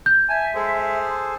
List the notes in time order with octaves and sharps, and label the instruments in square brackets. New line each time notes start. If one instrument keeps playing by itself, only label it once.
[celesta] G6
[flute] E5 [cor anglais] G#5 [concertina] A5
[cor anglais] G#3 [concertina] G#4 A4 C5